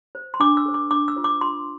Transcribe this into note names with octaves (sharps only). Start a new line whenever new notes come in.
C5
C6
D4 D6
E6
A4 C5
D6
D4 D6
E6
F4 C5
D6
F4 C6